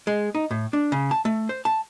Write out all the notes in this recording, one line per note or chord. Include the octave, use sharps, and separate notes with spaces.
G#3
D#4
A2
D4
C#3
A5
A3
C5
A5